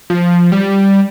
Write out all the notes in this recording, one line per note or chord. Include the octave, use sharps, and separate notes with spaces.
F3
G3